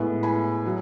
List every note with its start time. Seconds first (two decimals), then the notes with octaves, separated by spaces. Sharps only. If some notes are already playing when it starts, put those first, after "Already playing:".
Already playing: A2 G#3 B3
0.23 G#5 B5
0.66 F#3